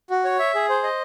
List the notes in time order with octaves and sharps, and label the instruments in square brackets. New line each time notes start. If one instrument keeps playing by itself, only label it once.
[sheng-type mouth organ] F#4
C#5
E5
G#4
C5
D#5